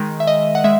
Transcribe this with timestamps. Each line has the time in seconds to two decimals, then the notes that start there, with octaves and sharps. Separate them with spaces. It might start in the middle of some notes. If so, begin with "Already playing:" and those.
Already playing: D#3 G#3
0.20 E5
0.27 D#5
0.55 F#5
0.64 G#3 E5